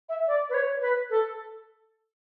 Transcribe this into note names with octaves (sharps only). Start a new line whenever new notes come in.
E5
D5
B4
C#5
B4
A4